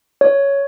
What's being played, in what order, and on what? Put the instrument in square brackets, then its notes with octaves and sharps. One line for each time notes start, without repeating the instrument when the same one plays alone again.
[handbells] C#5